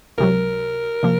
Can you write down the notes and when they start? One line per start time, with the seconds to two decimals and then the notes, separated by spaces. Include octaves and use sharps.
0.18 C#2 C3 F#3 A#4
1.03 C3 F3 A#3